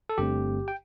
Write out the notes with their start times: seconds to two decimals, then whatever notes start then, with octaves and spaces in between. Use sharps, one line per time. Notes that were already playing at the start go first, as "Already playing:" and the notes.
0.09 A4
0.18 G1 G2 D3 A3 C4 G4
0.68 G5